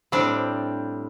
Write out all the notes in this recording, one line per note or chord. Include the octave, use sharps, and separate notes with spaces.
A2 G3 C4 D4